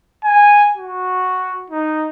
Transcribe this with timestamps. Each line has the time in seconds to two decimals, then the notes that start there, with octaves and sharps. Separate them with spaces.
0.24 G#5
0.77 F#4
1.70 D#4